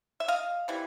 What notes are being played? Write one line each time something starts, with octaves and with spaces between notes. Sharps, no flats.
E5
D#5 F5
C3 E3 G3